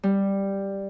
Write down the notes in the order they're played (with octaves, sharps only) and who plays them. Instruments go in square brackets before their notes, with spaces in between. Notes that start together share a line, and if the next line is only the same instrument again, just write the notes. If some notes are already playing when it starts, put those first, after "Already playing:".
[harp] G3